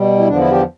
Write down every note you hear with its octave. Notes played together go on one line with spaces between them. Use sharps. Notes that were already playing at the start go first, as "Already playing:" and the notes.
Already playing: B2 G3
E4
E2 D3 F3 D4
E4
G4